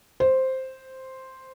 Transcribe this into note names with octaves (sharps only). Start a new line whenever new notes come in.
C5